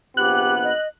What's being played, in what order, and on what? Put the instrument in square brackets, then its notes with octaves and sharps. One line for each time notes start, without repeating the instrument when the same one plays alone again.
[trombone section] A#1 C3 B3 [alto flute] G4 [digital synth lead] F#6
[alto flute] D#5